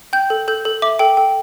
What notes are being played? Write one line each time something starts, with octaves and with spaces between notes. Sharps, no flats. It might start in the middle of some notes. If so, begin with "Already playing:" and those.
G5 G6
A4
A4 G6
A4
E5 D6
A4 G5
A4 G5